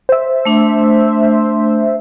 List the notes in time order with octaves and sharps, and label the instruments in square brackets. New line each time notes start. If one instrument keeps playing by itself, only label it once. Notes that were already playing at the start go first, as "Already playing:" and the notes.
[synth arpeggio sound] C5 E5
[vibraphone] A3 D4